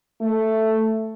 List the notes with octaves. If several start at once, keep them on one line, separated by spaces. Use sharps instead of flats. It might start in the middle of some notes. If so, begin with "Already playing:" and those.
A3